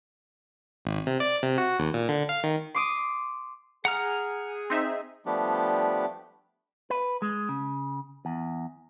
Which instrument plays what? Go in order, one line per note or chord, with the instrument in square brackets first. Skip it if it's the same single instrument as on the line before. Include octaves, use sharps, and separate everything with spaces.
[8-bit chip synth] G#1
C3
D5
C3
F#4
D#2
A#2
D3
F5
D#3
[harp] C6 D6 D#6
[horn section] G#4 [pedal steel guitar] F#5 A#5 F6
[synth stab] C4 D#4 E5
[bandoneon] F3 G3 A3 B3 D4 G4
[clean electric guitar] B4
G#3
C#3
E2